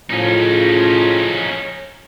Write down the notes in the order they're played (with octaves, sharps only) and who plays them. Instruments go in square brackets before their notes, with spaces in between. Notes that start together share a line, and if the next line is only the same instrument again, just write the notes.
[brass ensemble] A2 C#3 F3 [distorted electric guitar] C#4 D#4